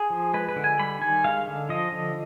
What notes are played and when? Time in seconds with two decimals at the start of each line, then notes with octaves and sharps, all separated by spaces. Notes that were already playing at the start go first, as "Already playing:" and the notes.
Already playing: G#4
0.10 F3
0.34 G#3 B4
0.49 B4
0.56 D3
0.64 G#5
0.79 G3 B5
1.01 D#3 G#5
1.24 G#3 F5
1.47 D3
1.69 F3 D#5
1.92 D3